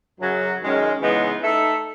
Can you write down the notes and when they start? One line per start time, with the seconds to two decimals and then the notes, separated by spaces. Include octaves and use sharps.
0.20 F#2 C#3 F#3
0.61 F#2 D#3 G#3 C#4
1.01 C#3 E3 G#3 B3 D#4
1.42 A3 D#4 A4 E5